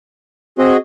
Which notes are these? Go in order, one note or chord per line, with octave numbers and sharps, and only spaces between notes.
C4 F#4 G#4 D#5